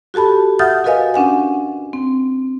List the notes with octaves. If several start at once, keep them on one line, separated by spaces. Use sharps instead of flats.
F#4 G4 A4 A5 B5
E5 F#5 D#6 F6 G6 A6
F#4 A#4 B4 D#5 F5 G#5
C#4 D4 F#5 G#5
C4